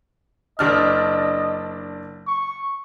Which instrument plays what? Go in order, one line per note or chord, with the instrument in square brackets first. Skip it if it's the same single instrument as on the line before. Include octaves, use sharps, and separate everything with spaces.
[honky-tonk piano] F#1 D4 F6 [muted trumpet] D#5
[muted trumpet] C#6